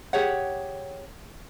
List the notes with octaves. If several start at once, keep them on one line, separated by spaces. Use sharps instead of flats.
G4 G#4 C#5 F#5